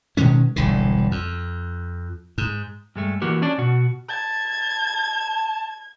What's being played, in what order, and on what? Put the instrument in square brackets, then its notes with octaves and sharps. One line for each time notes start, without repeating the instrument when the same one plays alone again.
[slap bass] B2 D#3 G#3 C#4
E1 C2 D3
F2
G#2
[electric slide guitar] G2 G#3 A3
E3 A#3 F#4 G4 A#4
C#4 D4 D5
B2 F#4
[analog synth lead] A5 [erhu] G#6